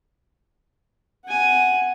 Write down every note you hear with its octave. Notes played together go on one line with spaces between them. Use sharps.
F#5 G#5